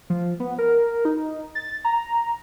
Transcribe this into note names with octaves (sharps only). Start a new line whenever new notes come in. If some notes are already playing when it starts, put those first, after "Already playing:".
F3
B3
A#4
D#4
A6
A#5